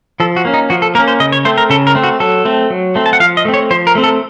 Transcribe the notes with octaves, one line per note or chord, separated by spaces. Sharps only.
F3 A4
F#4
A#3 C#4
D#4
F3 F#4
A4
A#3 C#4 A#4
C5
C#3 D#5
C#5
A3 C4 C5
A#4
C#3 A4
A#4
A3 C4
F#4
F#3 A4
A3 C4
F#3
A3 C4
A5
F#5
F3 F5
D#5
A3 C4
C#5
F3 C5
A#4
A3 C4
A4